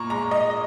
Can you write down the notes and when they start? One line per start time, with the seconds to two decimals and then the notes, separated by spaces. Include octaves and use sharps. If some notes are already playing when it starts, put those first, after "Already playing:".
Already playing: A#2 A#5 C#6
0.10 G#3 A#5
0.31 D#5